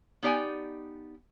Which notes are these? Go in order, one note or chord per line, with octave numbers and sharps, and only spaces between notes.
B3 D#4 G4 D5 G5 G#5